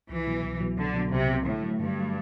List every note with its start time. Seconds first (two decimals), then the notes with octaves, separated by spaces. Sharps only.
0.09 C2 E3
0.27 B2 F#3
0.43 C2
0.60 B2 F#3
0.77 C2 D3
0.94 B2 F#3
1.11 C2 C3
1.28 B2 F#3
1.45 A2 D3
1.62 F#3 A3
1.80 G2 D3
1.96 F#3 A3